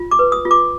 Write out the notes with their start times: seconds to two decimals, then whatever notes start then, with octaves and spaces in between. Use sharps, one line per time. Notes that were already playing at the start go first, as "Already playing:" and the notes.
Already playing: F4
0.11 D6
0.19 B4
0.32 D#6
0.45 F4
0.51 D6